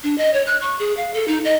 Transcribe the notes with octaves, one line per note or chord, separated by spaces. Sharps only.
D4
D#5
C#5
F#6
C#6
G#4
F5
A4
D#4
D#5